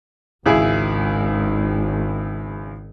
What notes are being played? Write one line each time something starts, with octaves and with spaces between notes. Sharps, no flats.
G#1 C#2 E4 G#4